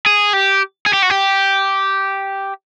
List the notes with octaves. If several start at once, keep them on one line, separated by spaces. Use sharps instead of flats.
G#4
G4
G#4
G4
F#4
G4